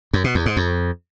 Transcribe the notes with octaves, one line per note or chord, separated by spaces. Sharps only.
F#2
B2
E2
G#2
F2